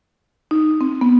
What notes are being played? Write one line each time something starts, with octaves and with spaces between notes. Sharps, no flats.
D#4
C4
B3